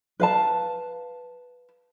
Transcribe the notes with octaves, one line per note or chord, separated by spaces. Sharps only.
B4 F5 A5